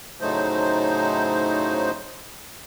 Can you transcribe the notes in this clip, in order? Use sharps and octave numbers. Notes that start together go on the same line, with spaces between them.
A2 C#3 F#3 A3 D#4 C5